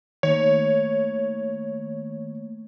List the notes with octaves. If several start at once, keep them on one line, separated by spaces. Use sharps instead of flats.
D#3 A3 A#3 C#5